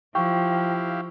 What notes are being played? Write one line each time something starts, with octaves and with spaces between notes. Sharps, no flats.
F3 E4 G4 F5 G5 C#6